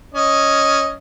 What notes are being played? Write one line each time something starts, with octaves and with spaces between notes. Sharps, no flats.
C#4 D#5